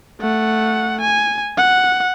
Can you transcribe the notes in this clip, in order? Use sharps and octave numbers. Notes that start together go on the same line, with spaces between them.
A3 F#5
G#5
F#5